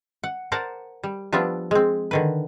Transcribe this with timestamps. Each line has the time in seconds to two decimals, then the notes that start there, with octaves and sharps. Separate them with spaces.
0.24 F#5
0.52 A#4 C5 D5 F#5 A5 A#5
1.04 G3
1.32 F3 G3 B3 D4 F4 E5
1.71 G#3 C4
2.11 D3 D#3 B4